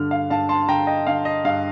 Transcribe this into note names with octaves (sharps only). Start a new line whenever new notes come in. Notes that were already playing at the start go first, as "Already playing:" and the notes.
Already playing: G2 D3 F6
F5
G2 F5 A5
A5 C6
D3 G5 A#5
D#5 G5
D3 F5
D#5
G2 F5